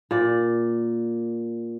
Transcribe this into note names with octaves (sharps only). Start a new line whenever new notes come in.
A#2 D5